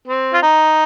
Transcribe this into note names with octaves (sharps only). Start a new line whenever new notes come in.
C4
F4
D#4